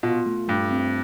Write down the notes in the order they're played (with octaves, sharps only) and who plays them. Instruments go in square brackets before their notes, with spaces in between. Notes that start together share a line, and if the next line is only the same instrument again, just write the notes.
[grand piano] B2 [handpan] F4
[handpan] A3
[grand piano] G2 [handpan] A3
[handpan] C4